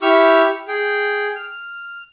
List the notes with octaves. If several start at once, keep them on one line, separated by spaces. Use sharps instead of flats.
E4 G4 C#6 E6 F6
G#4 G5
F6